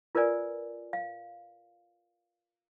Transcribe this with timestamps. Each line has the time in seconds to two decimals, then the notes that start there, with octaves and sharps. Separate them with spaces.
0.15 F4 A#4 B4 D5 G#5
0.93 F5